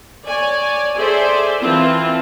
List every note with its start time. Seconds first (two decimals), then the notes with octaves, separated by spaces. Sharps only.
0.24 C#5 D5 G#5
0.97 G#4 A4 C5 D5 E5
1.60 E3 C4 F4 A5